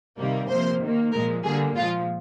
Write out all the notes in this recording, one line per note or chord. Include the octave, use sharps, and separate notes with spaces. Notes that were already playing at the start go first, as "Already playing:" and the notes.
C3 D#3 G3 A#3
C3 F3 A#3 C5
D#3 A#3
A#2 F3 G#3 A#4
D3 G3 A#3 G#4
A#2 F3 G#3 F4